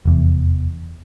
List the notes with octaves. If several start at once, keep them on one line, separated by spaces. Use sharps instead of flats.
F1 E2